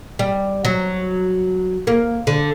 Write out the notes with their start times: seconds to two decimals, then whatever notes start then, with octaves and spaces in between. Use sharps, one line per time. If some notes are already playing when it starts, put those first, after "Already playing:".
0.19 G3
0.65 F#3
1.87 A#3
2.27 D3